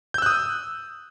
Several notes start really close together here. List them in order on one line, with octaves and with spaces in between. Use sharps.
G6 E6 F#6 D#6